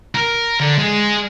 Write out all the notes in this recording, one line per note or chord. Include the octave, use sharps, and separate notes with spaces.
A#4
D3
G#3